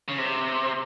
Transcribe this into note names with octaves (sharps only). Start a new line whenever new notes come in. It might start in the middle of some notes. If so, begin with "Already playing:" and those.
C#3
C3